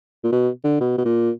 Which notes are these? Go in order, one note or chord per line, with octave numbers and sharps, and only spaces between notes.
A#2
B2
D3
B2
B2
A#2